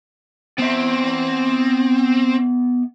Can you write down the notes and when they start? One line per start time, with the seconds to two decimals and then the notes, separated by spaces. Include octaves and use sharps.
0.59 B3 C4 E5